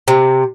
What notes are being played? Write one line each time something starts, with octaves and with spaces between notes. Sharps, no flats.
C3